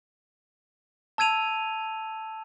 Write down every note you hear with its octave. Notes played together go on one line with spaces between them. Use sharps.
A5 E6 G#6 D#7 F7